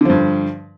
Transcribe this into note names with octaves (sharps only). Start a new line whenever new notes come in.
G2 D3 F3